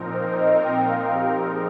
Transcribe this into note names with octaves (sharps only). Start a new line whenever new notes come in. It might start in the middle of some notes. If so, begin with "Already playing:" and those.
Already playing: A#2 F3 C4 D#4 A#4
C5
D#5
G5
F5
G4
G#4